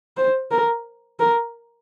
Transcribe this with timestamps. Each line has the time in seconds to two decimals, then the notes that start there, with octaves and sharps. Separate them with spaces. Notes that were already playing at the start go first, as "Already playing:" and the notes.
0.17 C5
0.51 A#4
1.20 A#4